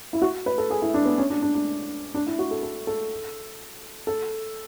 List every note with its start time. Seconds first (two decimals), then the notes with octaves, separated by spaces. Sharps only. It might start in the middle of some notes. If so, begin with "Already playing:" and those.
0.13 E4
0.22 F#4
0.46 B4
0.58 A4
0.70 G#4
0.82 E4
0.94 D4
1.06 B3
1.18 C#4
1.30 D4
1.42 D4
1.55 D4
2.14 D4
2.27 E4
2.39 F#4
2.51 A4
2.63 A4
2.87 A4
4.07 A4